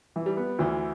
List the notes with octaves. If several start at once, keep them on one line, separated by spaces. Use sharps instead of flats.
E3
G3
B3
D2 E3